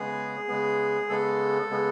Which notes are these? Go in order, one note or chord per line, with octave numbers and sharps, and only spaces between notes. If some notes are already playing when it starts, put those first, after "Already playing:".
Already playing: C#3 G#3 B3 G#4
C#3 G#3 B3
C#3 G#3 B3 A4
C#3 G#3 B3